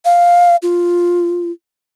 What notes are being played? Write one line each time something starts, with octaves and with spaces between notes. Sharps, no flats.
F5
F4